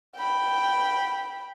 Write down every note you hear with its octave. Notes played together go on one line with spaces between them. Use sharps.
G5 B5